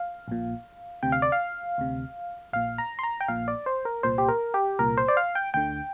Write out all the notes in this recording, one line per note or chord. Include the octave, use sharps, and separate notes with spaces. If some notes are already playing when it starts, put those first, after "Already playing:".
Already playing: F5
A#1 A#2
D2 C3 G5
F5
D5
F5
D2 C3
A#1 A#2 F5
A#5
C6
A#5
G5
A#1 A#2 F5
D5
C5
A#4
C2 A#2 C5
G4
A#4
G4
C2 A#2 A#4
C5
D5
F5
G5
D2 D3 G5